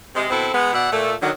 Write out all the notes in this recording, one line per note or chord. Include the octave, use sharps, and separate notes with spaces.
C3 G#3
B2 C4 E4 A4
G#3 B3
B2 D5 E5 F#5
A#2 A3
D3 D#3 F#3